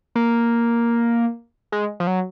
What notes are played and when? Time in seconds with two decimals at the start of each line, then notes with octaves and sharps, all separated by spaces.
0.15 A#3
1.72 G#3
2.00 F3
2.07 F#3